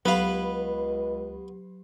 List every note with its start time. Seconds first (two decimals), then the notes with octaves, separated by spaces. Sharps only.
0.05 C#2 F#3 B3 G4 B4 F5